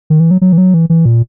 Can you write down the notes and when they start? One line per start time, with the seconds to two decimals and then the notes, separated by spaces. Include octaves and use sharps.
0.10 D#3
0.20 E3
0.31 F#3
0.41 F#3
0.53 E3
0.58 F#3
0.74 E3
0.90 E3
1.06 A#2